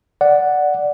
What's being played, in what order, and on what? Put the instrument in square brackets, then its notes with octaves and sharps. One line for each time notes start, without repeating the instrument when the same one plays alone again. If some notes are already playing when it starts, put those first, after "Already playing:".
[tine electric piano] D5 F#5